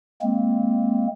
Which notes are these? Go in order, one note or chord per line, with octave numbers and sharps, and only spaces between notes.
G#3 A#3 C4